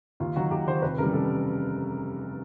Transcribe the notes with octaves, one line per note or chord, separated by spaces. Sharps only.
D#2 F4
D#3 F#3 F#4
D#2 G4
D#3 F#3 C5
F1 B4
D#2 C#3 E3 G3 A#4
F1 A4